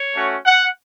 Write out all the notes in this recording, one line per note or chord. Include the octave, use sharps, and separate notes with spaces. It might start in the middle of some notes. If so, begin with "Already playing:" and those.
Already playing: C#5
A3 C#4 F#4
F#5